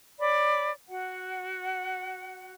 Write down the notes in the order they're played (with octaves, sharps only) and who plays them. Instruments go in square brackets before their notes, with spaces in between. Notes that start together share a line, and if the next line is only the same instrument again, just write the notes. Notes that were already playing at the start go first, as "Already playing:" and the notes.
[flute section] C#5 D5 B5
F#4 F#5